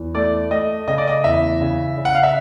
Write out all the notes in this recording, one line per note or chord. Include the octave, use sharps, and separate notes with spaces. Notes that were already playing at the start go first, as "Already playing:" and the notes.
Already playing: E2
A3 D5
A3 D#5
C#3 D#5
D5
D#5
E2 E5
C#3
C#3
F#5
F5
E5